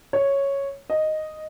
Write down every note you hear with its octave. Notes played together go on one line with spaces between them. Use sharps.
C#5
D#5